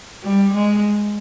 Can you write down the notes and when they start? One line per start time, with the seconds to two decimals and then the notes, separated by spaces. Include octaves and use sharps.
0.23 G3
0.53 G#3